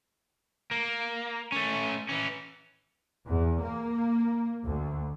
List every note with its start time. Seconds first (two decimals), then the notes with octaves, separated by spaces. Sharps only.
0.71 A#3
1.52 A3 C#4
2.09 E3 C#4
3.27 E2
3.62 A#3
4.64 D2